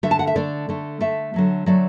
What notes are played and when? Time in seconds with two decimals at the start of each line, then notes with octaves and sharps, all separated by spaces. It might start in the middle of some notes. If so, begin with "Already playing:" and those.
0.03 D3 A3 E5
0.11 A5
0.19 F#5
0.27 E5
0.36 D3 A3 D5
0.69 D3 A3
1.01 D3 A3 E5
1.34 D3 F#3 A3
1.66 D3 F#3 A3 D5